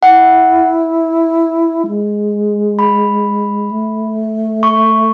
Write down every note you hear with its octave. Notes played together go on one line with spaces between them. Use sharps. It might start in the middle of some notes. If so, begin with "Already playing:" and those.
E4 F#5
G#3
B5
A3
C#6